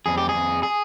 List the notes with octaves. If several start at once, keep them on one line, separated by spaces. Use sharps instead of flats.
F2 G#4
G4
G#4
F2
G#4